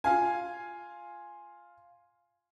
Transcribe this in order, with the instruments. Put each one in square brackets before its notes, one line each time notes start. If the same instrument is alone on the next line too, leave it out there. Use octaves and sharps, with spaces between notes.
[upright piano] F4 F5 G#5